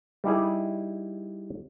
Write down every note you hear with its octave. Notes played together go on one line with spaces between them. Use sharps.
G3 D#4 E4 G#4